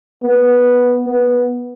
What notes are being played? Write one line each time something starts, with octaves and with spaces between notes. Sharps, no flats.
B3
B3